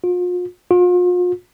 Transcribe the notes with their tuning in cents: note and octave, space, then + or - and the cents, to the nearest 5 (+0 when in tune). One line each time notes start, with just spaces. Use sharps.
F4 +40
F4 +40